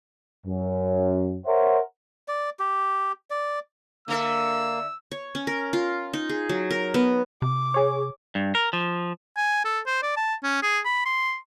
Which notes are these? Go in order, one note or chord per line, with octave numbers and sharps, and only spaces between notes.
F#2
A#4 C5 C#5 E5 F#5
D5
G4
D5
D3 A#3 A4 E5 E6
C#5
C#4
A#4
F4
D#4
G#4
F#3
A#4
B3
C3 D6
G#4 C#5
G2
A#4
F3
G#5
A4
C5
D5
A5
C#4
G#4
B5
C6